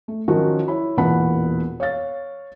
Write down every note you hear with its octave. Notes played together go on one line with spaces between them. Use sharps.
A3
D#3 F3 F#3 C#4 F#4 A#4
E4 C#5 B5
E1 E2 A#2 F#5 A5 B5
C#5 F5 A6